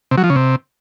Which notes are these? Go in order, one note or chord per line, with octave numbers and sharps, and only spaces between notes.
C3
F#3
F3
C#3
C3